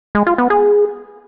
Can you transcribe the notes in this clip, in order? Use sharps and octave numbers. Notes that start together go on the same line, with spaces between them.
G#3
F4
B3
G#4